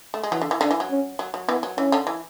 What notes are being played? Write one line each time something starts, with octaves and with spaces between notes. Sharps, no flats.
A3
G#3
E3 F#3
D3
E3
D3 D4
E3
F#3
C#4
F#3
F#3
E3 B3
F#3
E3 C#4
D3
E3